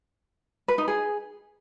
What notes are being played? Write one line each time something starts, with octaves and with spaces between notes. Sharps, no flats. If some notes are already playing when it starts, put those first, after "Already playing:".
B4
D#4
G#4